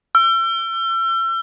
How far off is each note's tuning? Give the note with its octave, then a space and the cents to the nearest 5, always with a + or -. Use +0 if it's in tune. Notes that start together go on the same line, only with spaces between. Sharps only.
E6 +35